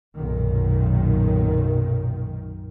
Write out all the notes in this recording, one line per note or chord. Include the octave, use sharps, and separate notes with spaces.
B1 F#2 A#2 D#3